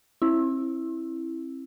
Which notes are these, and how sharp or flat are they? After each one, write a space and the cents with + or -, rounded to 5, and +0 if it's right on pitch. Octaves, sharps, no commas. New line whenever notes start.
C4 +40 E4 +0